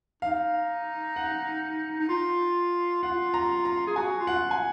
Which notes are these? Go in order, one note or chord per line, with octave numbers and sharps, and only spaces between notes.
D#4 F5
F#5
D#4
F4
F4 F#5
A#5
A#5
G#4
F#4 G#5
F4
F#5
G#5